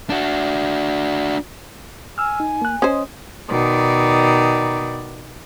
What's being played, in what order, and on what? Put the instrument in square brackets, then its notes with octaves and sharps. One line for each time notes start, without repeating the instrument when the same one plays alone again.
[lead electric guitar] D4 F#4
[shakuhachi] G#5 [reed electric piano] E6 F6
[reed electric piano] D#4
A#3 F#6
[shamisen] C#4 C5 [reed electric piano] D#5 D#6
[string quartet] B2 D#3 D5